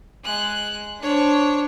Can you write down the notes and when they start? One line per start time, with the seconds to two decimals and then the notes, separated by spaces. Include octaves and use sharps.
0.24 G#3 F#6
1.02 D4 C5 C#5